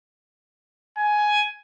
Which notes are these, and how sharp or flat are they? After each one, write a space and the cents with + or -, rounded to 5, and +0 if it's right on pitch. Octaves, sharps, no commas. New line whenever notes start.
G#5 +10